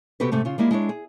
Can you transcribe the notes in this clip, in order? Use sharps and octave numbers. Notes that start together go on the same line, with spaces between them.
C3 B3 F#4 G4 A4 B4
G#2 C3 A3
C#3 F4
G3 G#3 A#3 E4
G#3 D4 E4 C#5
G#4